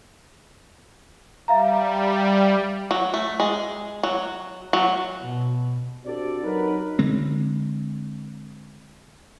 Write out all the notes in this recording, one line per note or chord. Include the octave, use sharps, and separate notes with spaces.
G3 E5 F5 A#5
F#3
A3
G#3
F#3
F#3
B2
C4 D4 F#4 G4 A4 D5
F#3 D#4 A#4 B4
D3 G#3 C4